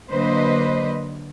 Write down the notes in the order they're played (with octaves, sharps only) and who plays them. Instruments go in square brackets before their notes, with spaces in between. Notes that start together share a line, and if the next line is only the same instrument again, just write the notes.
[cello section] D3 F#3 A#3 B4 C5 D#5